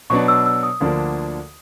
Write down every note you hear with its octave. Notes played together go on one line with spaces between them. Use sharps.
B2 F#3 B3 D4 C#6
E6
E6
D#6
D2 D3 F3 A#3 D4